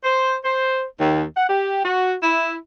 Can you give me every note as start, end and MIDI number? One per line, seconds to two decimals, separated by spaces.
0.04 0.35 72
0.44 0.83 72
1.00 1.23 39
1.36 1.47 78
1.48 1.80 67
1.83 2.13 66
2.23 2.55 64